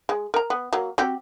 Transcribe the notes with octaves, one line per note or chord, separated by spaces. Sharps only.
G#3
A#4 A#5
B3
F#3 A#3
C4 F#4 G4